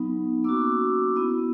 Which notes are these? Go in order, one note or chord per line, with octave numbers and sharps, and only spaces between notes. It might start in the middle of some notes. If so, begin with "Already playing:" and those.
Already playing: F#3 B3 D#4
A#3 C#4 F#4 D6 E6
B3 E4